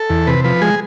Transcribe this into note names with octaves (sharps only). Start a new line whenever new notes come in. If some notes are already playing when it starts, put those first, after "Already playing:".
Already playing: A4
E2
C3 B4
F3 B4
G#3 G#4